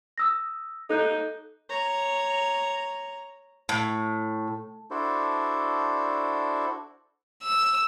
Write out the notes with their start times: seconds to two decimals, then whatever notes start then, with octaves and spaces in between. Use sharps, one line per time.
0.18 D#6 E6 A#6
0.90 D#4 A4 F#6 G6
1.69 C#5 A#5
3.69 A2
4.91 D4 E4 F#4 A4 C5 D5
7.43 E6